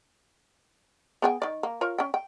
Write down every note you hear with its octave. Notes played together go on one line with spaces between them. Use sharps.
B3 G#4 G5
D#3 D5
A#3
F4 A#4 C#5
C#4 G5
G5